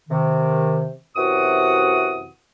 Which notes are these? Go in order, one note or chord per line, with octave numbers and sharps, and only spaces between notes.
C3 D#3
F#2 C3 E3 F#4 F#5 D#6